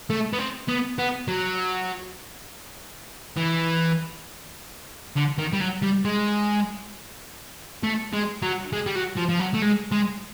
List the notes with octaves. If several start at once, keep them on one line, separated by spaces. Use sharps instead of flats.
A3
B3
C4
B3
B3
F#3
E3
D3
D#3
G3
F#3
G3
G#3
A3
G#3
F#3
G#3
G3
F#3
F3
F3
F#3
A3
G#3
G#3